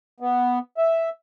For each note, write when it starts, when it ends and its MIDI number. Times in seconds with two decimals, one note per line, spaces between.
0.20 0.59 59
0.78 1.09 76